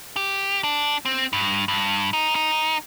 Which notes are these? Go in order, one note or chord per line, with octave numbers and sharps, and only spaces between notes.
G4
D4
C4
G2
G2
D#4
D#4